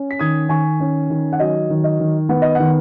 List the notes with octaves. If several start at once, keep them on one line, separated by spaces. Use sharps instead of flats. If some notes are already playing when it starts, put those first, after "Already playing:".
Already playing: C#4
B6
D#3 D#6 G#6
D#3 G#5 C#6
C#4
D#3
F#5
F#3 D#5
D#3
D#5
D#3
B3 F#5
D#5
D#3 F#5